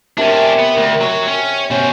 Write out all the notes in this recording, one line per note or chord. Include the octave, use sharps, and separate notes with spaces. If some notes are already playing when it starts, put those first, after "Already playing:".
C3 C#4 D4 A#4
B3
D2
F#3 C#5
C#4
B2 C#4 C5 C#5